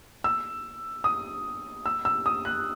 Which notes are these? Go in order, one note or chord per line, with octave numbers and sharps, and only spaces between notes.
E6
D#6
E6
E6
D#6
F#6